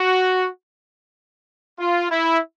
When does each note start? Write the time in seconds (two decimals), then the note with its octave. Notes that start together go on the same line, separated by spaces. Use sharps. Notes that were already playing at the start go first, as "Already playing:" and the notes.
Already playing: F#4
1.79 F4
2.10 E4